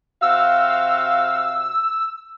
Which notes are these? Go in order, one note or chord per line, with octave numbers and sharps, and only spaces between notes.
C3 F#4 F5 E6